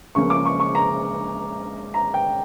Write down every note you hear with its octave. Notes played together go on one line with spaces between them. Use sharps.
C#2 C#3 F3 A#3 C#6
D6
C#6
C#6
A#5
A#5
G5